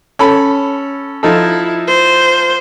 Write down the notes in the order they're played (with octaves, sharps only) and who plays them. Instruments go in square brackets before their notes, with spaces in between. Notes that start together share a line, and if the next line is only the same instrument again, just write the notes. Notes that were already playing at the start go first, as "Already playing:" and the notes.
[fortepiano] C#4 A4 B5
[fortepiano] F3 D#4 A4 [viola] E4
[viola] C5